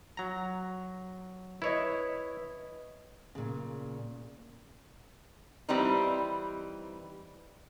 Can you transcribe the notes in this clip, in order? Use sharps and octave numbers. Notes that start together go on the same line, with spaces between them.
F#3 A#5
E4 B4 C#5 D#5
A#2 C#3
E3 G3 C4 D#4